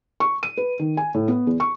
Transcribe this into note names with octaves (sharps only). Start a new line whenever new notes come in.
C#6
D#7
B4
D#3
G#5
A2
B3
E2
C#6